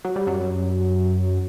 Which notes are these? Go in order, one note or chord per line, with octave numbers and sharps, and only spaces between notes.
F#3
G3
F#2 F#3